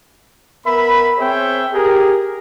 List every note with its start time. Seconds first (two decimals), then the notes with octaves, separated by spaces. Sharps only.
0.65 B3 A#4 E5 B5
1.18 C4 G#4 C5 C#5 E5 G5
1.72 G4 G#4 A#4